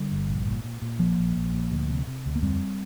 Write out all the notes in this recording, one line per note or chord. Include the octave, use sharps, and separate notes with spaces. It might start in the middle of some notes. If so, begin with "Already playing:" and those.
Already playing: D3 G3
G1
A#1
A#2
A#2
A#2
A#1 F3 A#3
A#1
A#1
A#2
D2
C3
C3
D2
A#3
F2 G3 C4